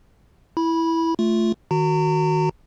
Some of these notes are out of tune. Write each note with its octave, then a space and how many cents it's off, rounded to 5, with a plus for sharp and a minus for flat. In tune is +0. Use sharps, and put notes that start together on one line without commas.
E4 +0 B5 -15
A3 +0 F4 -5
D#3 +0 F#4 +0 A#5 -35